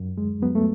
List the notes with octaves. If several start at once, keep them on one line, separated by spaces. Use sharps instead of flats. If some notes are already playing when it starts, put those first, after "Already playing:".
Already playing: F#2
D2 G#3
F#3 B3
A3